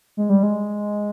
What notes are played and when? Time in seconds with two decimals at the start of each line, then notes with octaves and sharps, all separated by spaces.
0.17 G#3
0.29 G3
0.43 G#3